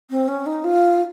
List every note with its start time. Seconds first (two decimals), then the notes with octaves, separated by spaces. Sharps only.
0.10 C4
0.28 C#4
0.46 D#4
0.64 F4